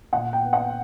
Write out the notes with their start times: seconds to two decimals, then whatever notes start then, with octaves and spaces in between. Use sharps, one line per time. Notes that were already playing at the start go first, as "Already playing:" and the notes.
0.13 A#2 F#5
0.33 G5
0.43 B3
0.53 F#5